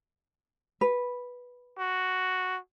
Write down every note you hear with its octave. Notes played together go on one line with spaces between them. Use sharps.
B4
F#4